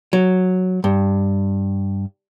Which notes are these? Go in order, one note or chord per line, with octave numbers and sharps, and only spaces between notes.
F#3
G2